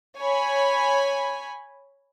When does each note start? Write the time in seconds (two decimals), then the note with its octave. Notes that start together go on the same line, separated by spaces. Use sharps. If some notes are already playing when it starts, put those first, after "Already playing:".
0.17 C#5 G#5 B5